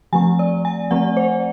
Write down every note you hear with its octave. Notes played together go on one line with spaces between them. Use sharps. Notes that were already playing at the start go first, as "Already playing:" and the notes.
F3 A3 C4 G#5
D5
G#5
F3 A3 C4 F#5
C5